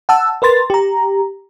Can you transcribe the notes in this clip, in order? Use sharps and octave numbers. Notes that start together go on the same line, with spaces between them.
F#5 A5 E6
A#4 B4 C6 A6
G4 A#5